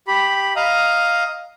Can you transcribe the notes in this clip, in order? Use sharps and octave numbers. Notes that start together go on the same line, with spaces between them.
G4 B5
D#5 F5 A#5 D#6